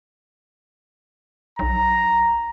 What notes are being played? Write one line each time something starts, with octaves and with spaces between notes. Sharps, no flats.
B1 A#5